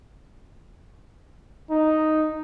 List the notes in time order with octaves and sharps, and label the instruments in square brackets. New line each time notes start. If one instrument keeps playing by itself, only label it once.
[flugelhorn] D#4